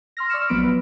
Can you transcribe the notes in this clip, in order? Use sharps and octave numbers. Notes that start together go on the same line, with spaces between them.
C6 F6 A#6
D5 C#6 E6 F6 C#7 E7
A#1 F3 F#3 B3 B5 D7
B4